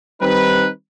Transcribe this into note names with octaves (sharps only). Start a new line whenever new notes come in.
D#3 G3 C4 D#4 B4